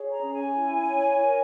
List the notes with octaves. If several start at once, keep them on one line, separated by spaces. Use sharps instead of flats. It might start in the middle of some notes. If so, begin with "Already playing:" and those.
Already playing: G#4 C#5
A#5
C#4
G#5
E4
C#5
A#4